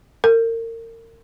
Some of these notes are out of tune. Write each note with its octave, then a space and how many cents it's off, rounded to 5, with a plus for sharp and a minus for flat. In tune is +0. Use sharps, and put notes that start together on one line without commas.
A#4 -35